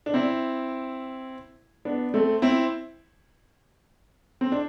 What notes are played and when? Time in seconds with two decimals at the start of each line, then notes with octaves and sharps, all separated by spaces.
0.06 D4
0.14 C4 E4
1.85 B3 D4
2.14 A3 C4
2.42 C4 E4
4.41 C4
4.52 D4